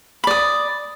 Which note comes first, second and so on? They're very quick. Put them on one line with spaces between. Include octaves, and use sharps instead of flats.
B5 D5 D#6